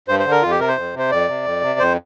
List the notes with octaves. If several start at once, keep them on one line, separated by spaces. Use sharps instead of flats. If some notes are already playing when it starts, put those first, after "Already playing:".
G2 C5
C5
D3
A#4
F2 F4
G4
C3 A#4
C5
F2
C3 C5
F2 D5
C3
F2
C3
F2 C5